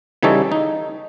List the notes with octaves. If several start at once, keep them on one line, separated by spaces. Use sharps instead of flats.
C#3 E3 G3 D#4 A4 C#5
D#4